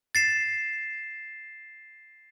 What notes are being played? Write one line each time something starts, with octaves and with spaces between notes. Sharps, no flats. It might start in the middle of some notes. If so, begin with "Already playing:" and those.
A6 C7 E7